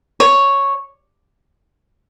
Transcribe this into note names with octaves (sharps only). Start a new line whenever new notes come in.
C#5